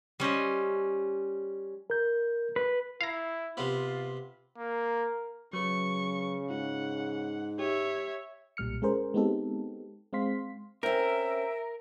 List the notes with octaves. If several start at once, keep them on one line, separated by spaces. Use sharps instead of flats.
G3 C#4 C5 D#5
A#4 G6
B4
E4 F5 A#5
C3 B3 F4
A#3 A#4
C#3 F#3 B4 C#6
G#2 F4 F#5
G4 C#5 E5
B1 A#2 G3 F6 C#7
G#3 C#4 G#4 A#4 C5
G#3 B3 C4 D#4 G4 A4
G#3 C4 F5 C6 B6
C4 C#4 A#4 E5